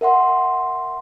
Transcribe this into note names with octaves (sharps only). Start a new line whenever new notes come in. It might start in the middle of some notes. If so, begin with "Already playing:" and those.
A#4 E5 F#5 C6